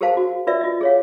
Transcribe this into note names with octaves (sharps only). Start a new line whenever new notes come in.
G4 G#4 A#4 C5 F5 A5
F#4
F4 A#4 B4 D5 E5
F4 D#5
G#4 C#5 F5